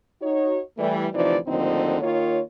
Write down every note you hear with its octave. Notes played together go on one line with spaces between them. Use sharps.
D#4 F#4 C#5
E3 G3 A3
D2 C3 E3 F3 D#4 D5
D#2 A2 D3 F3 C4 D#4
D#3 A#3 F4 C#5